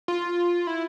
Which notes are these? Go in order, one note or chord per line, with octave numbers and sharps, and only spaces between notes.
F4
E4